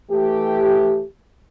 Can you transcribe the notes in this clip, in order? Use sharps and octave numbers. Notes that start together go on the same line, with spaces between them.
E3 A3 G4